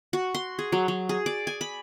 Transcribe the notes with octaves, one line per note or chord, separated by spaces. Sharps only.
F#4
C6
G#4
F#3
F#3
G#4
D5
G#5
B5